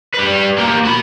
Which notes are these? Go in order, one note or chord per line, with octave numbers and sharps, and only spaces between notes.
G3 B4
A#3 G4
F#4 B5